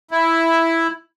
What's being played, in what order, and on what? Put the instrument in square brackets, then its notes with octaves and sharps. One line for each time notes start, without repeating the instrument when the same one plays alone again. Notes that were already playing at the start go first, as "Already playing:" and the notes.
[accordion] E4